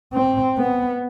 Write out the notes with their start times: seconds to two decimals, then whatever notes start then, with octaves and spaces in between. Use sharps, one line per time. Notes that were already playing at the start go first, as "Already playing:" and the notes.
0.14 C4
0.58 B3